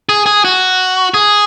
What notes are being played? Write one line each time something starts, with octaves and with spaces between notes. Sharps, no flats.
G#4
G#4
F#4
G#4